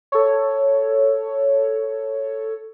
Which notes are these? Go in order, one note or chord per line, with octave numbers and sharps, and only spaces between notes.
A4 C#5